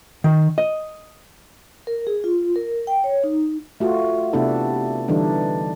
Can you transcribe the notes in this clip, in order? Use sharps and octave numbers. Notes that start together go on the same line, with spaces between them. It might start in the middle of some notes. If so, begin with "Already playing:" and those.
D#3
D#5
A#4
G#4
F4
A#4
G5
C#5
D#4
A3 F4 F#4
C3 A3 B3 D4 E4 A4
D3 E3 G3 D4 D#4